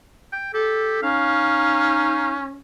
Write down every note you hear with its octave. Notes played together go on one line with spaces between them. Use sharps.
G5
G4 A4
C#4 D#4 F5